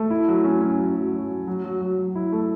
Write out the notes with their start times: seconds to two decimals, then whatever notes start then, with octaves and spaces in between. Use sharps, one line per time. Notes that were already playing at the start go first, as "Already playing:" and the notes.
Already playing: A3
0.10 E4
0.28 F#3
0.44 C#4
0.62 C#4
0.79 F#3
0.95 F#3
1.13 F#3
1.30 F#3
1.47 F#3
1.64 F#3
1.81 F#3
1.98 F#3
2.15 E4
2.32 A3